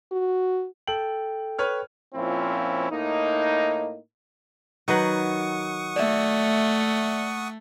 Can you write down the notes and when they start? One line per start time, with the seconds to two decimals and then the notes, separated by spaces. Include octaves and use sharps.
0.12 F#4
0.87 A4 G5 F#7
1.59 B4 C#5 F6
2.14 A#2 F3 C4 C#4 E4
2.91 A2 A#3 D#4
4.88 D#3 F#3 B4 F#5 C#6 D#6
5.96 A3 D5 E5